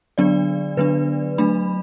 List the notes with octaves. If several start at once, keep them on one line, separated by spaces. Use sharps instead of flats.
D3 F#3 B3 D4 D5
D3 F#3 B3 D4 B4
F#3 A3 D4 B5